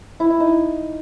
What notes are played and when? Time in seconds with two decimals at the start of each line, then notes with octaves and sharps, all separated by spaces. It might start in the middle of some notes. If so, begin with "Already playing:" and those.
0.20 E4
0.30 E4
0.40 D#4